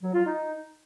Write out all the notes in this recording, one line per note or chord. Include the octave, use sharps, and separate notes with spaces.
F#3
F4
D#4